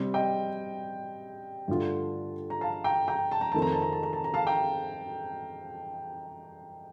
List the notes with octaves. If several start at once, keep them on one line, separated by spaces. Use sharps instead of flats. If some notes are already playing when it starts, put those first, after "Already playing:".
Already playing: C3 G3 C4
D#5 G5
G2 D3 A3 D4 F4
A#5
F5 A5
G5 A#5
G5 A#5
A5
A#5
F2 D#3 A3 C4 A5
A#5
A5
A#5
A5
A#5
A5
A#5
F5 A5
G5 A#5